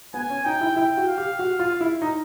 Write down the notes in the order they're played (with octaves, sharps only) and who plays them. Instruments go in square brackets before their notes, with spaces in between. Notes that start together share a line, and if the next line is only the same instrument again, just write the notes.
[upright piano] B3 [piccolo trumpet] G#5
[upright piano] C#4
[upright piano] D#4 [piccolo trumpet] G5
[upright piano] E4
[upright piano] E4 [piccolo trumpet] G5
[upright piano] F#4
[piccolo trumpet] F5
[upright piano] G4
F#4
F4
E4
D#4